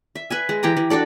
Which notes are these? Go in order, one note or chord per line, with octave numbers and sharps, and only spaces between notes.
E5
B4 E5 G#5
G#3
E3 G4 G5 A#5
E3
D4 F#4 A4 D5